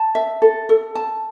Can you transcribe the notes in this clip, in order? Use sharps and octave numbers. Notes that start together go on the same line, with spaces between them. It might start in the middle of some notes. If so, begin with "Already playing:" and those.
Already playing: A5
E5
A4
A4
A5